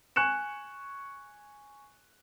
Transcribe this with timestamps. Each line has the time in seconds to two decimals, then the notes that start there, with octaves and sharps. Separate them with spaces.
0.16 G#5 C#6 F#6 C#7 E7